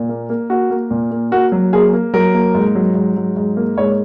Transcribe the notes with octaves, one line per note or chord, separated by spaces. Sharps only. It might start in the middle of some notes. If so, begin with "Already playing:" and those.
Already playing: A#2
A#3
A#3
A#3 F#4
A#3
A#2
A#3
A#3 F#4
F#3
A#3 G#4
A#3
F#3 A#4
A#3
G#2
F#3
G#2
F#3
G#2
A#3
G#2 C#5